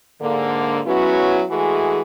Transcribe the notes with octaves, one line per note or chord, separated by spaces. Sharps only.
G#2 D3 A#3
F#3 G#3 B3 C#4 E4 F#4
E3 G#3 A3 F#4 G#4